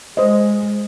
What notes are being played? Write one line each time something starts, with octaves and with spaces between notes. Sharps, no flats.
G#3 C5 D#5